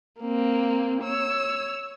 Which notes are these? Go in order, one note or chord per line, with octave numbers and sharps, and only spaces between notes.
A#3 C4
C#5 E6